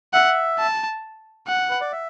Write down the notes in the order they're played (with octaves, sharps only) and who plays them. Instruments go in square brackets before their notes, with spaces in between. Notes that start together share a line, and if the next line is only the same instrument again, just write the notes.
[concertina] E5 [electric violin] F#5
[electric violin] A5
F#5
[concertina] B4
D5
E5